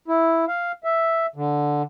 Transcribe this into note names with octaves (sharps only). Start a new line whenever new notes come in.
E4
F5
E5
D3